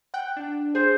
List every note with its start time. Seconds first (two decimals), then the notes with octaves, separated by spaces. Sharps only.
0.14 F#5 G5 F#6
0.36 D4
0.75 G#4 C5